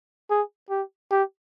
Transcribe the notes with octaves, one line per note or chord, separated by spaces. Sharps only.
G#4
G4
G4